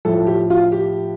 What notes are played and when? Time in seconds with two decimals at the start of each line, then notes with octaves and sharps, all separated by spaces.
0.05 A2 F3 A4
0.27 G4
0.50 F4
0.72 G4